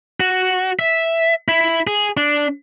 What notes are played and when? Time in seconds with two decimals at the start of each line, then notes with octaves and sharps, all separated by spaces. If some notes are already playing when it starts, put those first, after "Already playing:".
0.20 F#4
0.79 E5
1.48 E4
1.87 G#4
2.17 D4